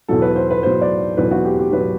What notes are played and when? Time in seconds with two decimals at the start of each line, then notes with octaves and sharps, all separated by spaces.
0.08 E2 B2 F#3 A4
0.22 B4
0.36 C5
0.50 B4
0.63 E2 B2 F#3 C5
0.81 D5
1.17 E2 B2 F#3 B4
1.31 F#4
1.45 G4
1.59 G4
1.72 B2 F#3 B4